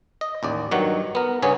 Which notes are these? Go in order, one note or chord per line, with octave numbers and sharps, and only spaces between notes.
D#5
A1 D#2 D5
G2 D#3 F#3 C#5 F#5
B3 A#4
G2 C#3 B3 C#4 G#4 C#5